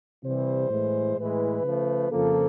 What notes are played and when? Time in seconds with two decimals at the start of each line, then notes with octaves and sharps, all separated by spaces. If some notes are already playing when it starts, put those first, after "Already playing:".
0.24 C3 E3 G3 C5
0.70 A2 E3 G#3
1.17 A2 E3 G#3 B4
1.64 C#3 F3 A3
2.11 F2 C#3 F3 A#3 A4